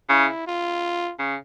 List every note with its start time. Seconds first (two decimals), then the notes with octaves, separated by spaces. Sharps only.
0.09 C#3 E4
0.47 F4
1.19 C#3